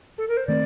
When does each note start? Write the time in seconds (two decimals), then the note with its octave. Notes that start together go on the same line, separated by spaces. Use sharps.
0.18 A4
0.28 A#4
0.37 C5
0.47 D#3 A3 C4 D5